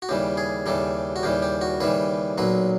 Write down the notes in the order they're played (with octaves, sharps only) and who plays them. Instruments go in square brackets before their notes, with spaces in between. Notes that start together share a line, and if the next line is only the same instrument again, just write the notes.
[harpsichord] F#4
D#2 C#3 E3 G3 G4
G#4
D#2 C#3 E3 G3 A4
F#4
D#2 C#3 E3 G3 G4
G4
F#4
D#2 C#3 E3 G3 B4
B1 A#2 F#3 B4